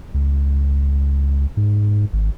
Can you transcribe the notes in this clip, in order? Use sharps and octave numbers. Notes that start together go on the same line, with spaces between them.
C#2
G#2
G#1